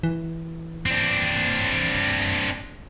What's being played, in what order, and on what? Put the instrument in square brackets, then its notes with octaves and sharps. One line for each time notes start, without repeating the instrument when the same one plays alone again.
[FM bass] E3
[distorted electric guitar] C4 D4